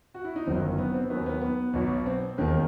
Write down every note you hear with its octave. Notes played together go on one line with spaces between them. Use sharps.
F#4
E4
D#4
G1 F#2 D#3 F#3 C4
B3
C4
D#2 D#3 F#3 B3
B3
B3
B1 B2 F#3
C4
E1 D#2 D#3